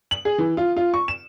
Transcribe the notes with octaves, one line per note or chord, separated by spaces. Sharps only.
F#7
G#4
E3
F4
F4
C#6
E7